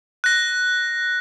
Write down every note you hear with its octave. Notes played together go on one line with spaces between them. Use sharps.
F#6 A#6